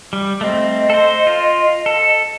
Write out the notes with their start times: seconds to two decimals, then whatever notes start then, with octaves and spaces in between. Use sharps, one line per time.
0.13 G3
0.41 A3 C4 D#5
0.90 A4 C5
1.27 F4
1.86 A4